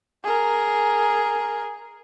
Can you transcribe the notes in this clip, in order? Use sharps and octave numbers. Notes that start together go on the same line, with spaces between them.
G#4 A#4